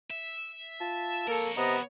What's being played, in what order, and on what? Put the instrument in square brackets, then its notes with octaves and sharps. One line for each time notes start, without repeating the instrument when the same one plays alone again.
[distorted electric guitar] E5
[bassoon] F4 [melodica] A5
[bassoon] A#3 [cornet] A4 [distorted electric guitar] A#4 C#5
[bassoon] C3 [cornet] B3 [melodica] D#5 A#5